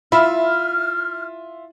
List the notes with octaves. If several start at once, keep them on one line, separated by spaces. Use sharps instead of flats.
E4 F4 E5 B5 F6